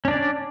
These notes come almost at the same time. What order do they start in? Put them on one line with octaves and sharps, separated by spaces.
C#4 D4 D5